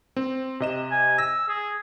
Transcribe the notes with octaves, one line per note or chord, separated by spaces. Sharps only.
C4
C3 D#5 E7
G#5
E6 A#6
G#4